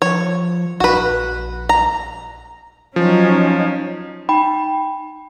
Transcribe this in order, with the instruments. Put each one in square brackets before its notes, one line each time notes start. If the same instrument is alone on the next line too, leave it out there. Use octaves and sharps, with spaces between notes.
[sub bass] F3 [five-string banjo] C#5
[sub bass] A#1 [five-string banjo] F#4 B4
[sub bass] A#1
[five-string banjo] A#5
[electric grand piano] F3 [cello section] F#3 C#4 D#4
[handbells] D#4 G5 B5